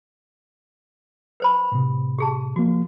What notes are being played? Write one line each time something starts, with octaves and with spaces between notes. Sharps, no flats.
B4 C5 B5
A2 C3
G4 G#4 A5
F3 A#3 F#4